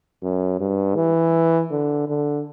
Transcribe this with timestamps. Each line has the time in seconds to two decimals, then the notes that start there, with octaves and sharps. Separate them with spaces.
0.22 F#2
0.60 G2
0.96 E3
1.70 D3
2.09 D3